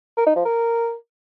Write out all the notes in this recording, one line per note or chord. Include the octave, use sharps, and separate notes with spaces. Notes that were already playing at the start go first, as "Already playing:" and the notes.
A#4
D#4
F3
A#4